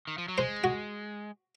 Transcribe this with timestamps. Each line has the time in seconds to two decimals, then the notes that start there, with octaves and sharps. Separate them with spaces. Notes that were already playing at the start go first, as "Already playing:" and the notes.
0.07 D#3
0.18 F3
0.28 F#3
0.38 G#3 C5
0.64 F#4